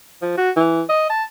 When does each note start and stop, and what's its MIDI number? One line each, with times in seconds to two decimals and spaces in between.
0.22 0.33 53
0.37 0.50 66
0.56 0.82 52
0.89 1.06 75
1.10 1.23 81